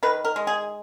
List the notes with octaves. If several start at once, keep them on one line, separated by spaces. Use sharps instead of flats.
D#3 B4
A#4
G#3
G#4